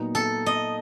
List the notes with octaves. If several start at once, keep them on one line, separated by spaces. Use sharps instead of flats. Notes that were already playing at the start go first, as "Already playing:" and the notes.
Already playing: A#2 F#3 B3 D#4
A4
D#5